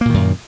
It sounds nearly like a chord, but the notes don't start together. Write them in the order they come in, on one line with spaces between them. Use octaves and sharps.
A#3 A#2 D#3 F#2